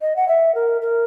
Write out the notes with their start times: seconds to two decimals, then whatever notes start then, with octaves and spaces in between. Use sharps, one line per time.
0.02 D#5
0.16 F#5
0.28 E5
0.55 A#4
0.81 A#4